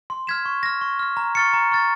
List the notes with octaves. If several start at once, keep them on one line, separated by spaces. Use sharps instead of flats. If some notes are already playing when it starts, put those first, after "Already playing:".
C6
F6 G#6 B6 E7
C#6
F6 A#6
C#6
F6 A#6
A#5
C#6 F6 A6 C#7
A#5
C#6 F6 A6 C#7